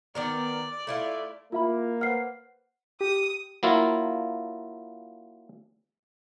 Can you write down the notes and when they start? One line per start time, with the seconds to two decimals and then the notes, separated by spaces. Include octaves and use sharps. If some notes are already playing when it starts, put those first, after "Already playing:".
0.15 D#3 B3 A#4 D5
0.87 A3 E4 F4
1.52 A#3 E4 F4 E5 B5
2.01 B4 C5 F#5 F6 C7
3.01 G4 D#6
3.63 F#3 A#3 E4 F4